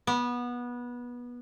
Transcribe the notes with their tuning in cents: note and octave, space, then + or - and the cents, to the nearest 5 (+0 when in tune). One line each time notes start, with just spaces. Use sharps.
B3 -20